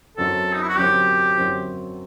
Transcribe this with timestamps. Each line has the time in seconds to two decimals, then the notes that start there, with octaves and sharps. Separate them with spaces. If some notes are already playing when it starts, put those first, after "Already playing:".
0.17 F#2 F#3 C4 A4
0.53 D#4
0.62 E4
0.68 F#4
0.77 F#2 F#3 C4 G4
1.37 F#2 F#3 C4